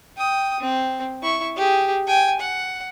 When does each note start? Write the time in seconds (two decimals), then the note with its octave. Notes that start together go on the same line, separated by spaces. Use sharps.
0.17 G5 D#6
0.60 C4
1.22 E4 C#6
1.56 G4 G#4
2.07 G5 G#5
2.40 F#5